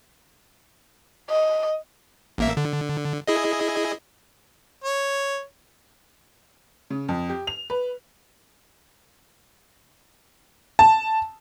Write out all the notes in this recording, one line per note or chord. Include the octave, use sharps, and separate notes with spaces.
D#5
A1 A#3 E5
D3
E4 G#4 D#5
C#5
C#3
F2
G4
F7
B4
A5